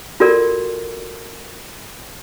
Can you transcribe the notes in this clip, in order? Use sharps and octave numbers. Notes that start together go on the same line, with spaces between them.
F4 F#4 A4 A#4 D5